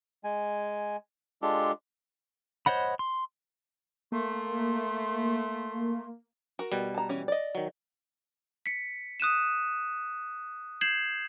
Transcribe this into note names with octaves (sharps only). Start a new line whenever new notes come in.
G#3 G#5
G#3 D4 F4 G4 A4 C6
C5 C#5 D#5 F#5 B5
C6
A3 A#3 C6
F#4 A#4
B2 G3
A5 A#5
E3 C#4
D5 D#5
D#3 F#3
B6 C#7
D#6 F#6 D#7 E7
G6 G#6 C7 E7 F#7